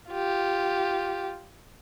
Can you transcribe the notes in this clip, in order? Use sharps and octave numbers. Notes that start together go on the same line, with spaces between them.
F4 G4